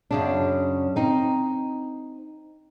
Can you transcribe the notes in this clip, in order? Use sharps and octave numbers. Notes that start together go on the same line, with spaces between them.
F#2 C#3 D4
C4 D#4